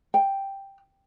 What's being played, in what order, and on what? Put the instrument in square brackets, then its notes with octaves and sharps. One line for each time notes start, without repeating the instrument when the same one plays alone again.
[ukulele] G5